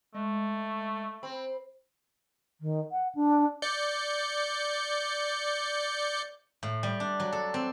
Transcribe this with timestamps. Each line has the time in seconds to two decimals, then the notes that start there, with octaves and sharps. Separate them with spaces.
0.14 G#3 A3
1.23 C4 B5
2.61 D#3
2.92 F#5
3.15 D4
3.62 D5 G6 C#7
6.63 A2
6.83 G3
7.00 D4
7.20 F#3
7.33 A4
7.54 C4